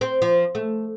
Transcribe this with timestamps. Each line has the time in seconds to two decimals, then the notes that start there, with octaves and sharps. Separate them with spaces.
0.01 C4
0.22 F3
0.55 A3